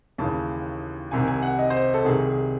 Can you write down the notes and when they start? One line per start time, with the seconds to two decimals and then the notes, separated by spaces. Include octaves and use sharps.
0.18 D#2 C#3 E3 A5
1.11 C2 C3 D#3 G#5
1.27 G#5
1.42 F#5
1.59 D#5
1.70 C5
1.94 A4
2.04 C2 C3 D#3 G#4
2.28 G#4